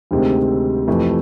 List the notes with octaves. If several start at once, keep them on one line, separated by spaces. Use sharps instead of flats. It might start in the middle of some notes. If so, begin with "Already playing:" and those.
D2 C3 D#3 G#3 C4
F2 C3 E3 A3